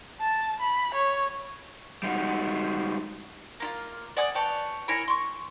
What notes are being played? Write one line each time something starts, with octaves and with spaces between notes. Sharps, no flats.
A5
B5
C#5
G3 G#3 D#4 F#4
A#3 E4 F4
D5 F#5 G#5 D#6
B4 C#5 G5 A5
E4 A#4 C#5 G#5
C6 C#6